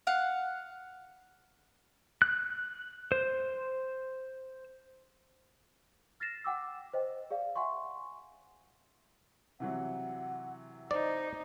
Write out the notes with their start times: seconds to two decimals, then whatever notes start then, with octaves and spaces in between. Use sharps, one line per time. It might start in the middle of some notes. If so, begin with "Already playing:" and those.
0.07 F5 F#5
2.22 F#6
3.12 C5
6.20 F6 A6 A#6 C7 E7
6.44 F#5 G5 D6 E6
6.94 C5 D#5 G5
7.31 G#4 D5 F5
7.56 E5 F#5 G#5 C6 C#6
9.60 C3 E3 F#3 F#5
10.91 D#4 C5 D5